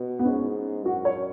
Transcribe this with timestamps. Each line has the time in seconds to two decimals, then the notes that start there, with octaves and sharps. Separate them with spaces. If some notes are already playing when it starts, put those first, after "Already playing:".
Already playing: B2
0.19 B3
0.25 G#2 C#4
0.85 F#2 F#4
1.05 C#5